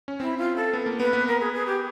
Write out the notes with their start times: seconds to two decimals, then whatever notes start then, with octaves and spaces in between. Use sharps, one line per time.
0.08 C#4
0.20 C4 E4
0.37 F4
0.56 A4
0.73 B3
0.86 A#3
1.00 B3 B4
1.13 B3
1.27 A#4
1.40 G#4
1.53 G#4
1.66 G4